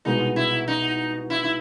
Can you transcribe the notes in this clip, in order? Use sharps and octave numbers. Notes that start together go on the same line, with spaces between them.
C2 B2 G#3 B3 D#4
E4
D#4
E4
E4